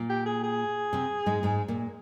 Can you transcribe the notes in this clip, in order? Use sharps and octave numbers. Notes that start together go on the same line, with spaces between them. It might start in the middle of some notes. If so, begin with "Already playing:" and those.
Already playing: A#2 A#3
G4
G#4
G#4
C3 C4
G#2 G#3
G#2 G#3
A#2 A#3